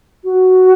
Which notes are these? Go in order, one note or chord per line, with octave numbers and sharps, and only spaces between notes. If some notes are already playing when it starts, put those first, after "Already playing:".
F#4